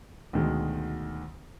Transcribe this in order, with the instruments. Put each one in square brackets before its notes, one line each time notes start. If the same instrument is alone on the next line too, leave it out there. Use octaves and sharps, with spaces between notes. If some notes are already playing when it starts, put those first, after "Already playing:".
[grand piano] D2 B2 D#3 G#3